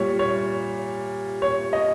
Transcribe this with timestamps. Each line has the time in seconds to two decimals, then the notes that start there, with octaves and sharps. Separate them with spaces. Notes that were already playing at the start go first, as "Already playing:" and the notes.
Already playing: A#2 G3 C#5
0.19 C#5
1.42 C#5
1.73 D#5